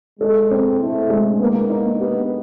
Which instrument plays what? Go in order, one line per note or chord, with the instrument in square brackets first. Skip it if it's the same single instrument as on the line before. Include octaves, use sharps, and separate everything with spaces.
[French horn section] G#3 [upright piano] A4
[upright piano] C4
[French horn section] A3 [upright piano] E4
[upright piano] G#3
[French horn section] A#3 [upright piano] B3
[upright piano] D#4
[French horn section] B3 [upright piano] G4